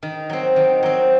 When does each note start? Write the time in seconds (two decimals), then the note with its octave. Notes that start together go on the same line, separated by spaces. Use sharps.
0.03 D#3
0.29 F#3 C4
0.56 D#3
0.83 F#3 C4